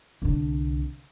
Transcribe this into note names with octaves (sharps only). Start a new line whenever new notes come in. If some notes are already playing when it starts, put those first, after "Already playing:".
C2 D3